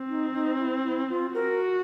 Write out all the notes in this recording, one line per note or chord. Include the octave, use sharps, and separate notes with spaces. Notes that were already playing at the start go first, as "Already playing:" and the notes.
Already playing: C4
D#4
D#4
E4
E4
F4
F#4 A#4